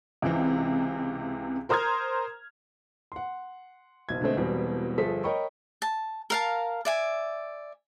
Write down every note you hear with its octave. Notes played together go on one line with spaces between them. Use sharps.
C#2 C3 E3 C4
A#4 C5 A#5 D#6 F6 G#6
F#5 C6
F#1 B1 G#6
B2 D3 G#3 A3 C4
E1 E2 B2 G3 C4
G1 F3 G#4 A4 B6
A#4 C#5 D#5 G5 B5 C#6
A5
A#4 F5 A5
D5 E5 G#5